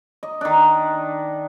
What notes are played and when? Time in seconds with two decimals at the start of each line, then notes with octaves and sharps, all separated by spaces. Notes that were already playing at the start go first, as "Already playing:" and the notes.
0.23 D#5
0.41 D#3 D4